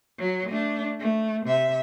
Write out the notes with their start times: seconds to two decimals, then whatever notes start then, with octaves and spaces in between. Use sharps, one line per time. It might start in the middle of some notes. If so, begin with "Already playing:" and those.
0.19 F#3
0.50 A3 D4
1.00 A3
1.46 C3 E5